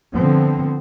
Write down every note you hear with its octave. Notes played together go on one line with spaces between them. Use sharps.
D3 F3 B3 C4